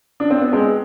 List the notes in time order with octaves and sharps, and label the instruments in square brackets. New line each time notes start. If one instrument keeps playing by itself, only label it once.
[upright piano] D4
C4
B3
G#3 C4